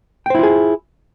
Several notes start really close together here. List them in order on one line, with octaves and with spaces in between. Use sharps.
G5 C5 E4 F4 G#4